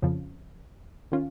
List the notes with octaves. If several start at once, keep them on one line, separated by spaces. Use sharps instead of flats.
F2 C#3 F3
D#3 C#4 F4